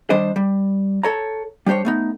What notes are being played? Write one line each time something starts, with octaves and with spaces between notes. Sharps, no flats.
D#3 G3 D4 C5 D#5
G3
A4 C#5 A#5
G3 D4 G4 C5 C#5
A3 B3 D#4